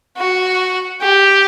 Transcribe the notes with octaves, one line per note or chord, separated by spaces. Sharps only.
F#4
G4